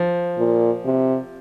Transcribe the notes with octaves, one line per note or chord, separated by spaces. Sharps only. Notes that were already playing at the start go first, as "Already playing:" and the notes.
Already playing: F3
A#2
C3